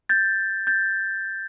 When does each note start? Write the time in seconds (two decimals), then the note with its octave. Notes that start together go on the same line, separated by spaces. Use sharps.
0.09 G6 A6
0.67 G6 A6